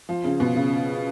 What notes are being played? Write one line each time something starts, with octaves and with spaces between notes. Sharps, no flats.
F3
C#3
B2
C#3